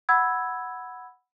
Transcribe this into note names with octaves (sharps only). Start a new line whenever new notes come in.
F#5 B5 E6 G#6